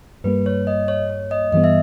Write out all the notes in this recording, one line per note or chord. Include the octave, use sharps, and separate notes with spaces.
G2 G3 A#3 B4
C#5
D#5
C#5
C#5
D#5
G2 E3 G3 B3 D#5
E5